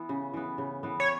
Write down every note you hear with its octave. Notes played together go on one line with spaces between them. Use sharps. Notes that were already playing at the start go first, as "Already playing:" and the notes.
Already playing: E3 B3
C#3
E3 B3
C#3
E3 B3
C#5